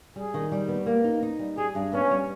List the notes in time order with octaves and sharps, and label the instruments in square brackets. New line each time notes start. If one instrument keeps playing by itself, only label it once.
[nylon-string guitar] G3 [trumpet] G#4
[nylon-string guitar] D#3
G3
B3
A#3
D#4
D#4
G3
[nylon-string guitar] G4 [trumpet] G#4
[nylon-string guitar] G2
[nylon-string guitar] B3 [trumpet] C#4
[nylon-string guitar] G3